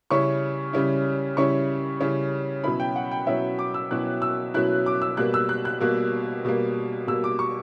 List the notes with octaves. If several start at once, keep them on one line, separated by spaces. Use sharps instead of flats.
C#3 G3 C#4 E4 C#6
C#3 G3 C#4 E4
C#3 G3 C#4 E4 C#6
C#3 G3 C#4 E4
B2 F#3 C#4 E4 B5
G5
F#5
G5
B2 F#3 C#4 E4 E5
D6
E6
B2 F#3 C#4 E4 F#6
E6
B2 F#3 C#4 E4 F#6
D6
E6
B2 G3 A#3 F#6
E6
F#6
F#6
B2 G3 A#3
B2 G3 A#3
B2 G3 A#3 E6
D6
C#6